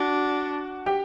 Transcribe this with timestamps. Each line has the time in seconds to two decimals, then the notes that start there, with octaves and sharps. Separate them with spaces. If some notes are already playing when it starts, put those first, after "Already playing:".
Already playing: D4 F#4 F#5
0.86 G4 G5